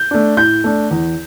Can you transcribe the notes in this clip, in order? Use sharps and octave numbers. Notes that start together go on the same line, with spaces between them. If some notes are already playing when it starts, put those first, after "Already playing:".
Already playing: G6
A3 D4
A2 G6
A3 D4
E2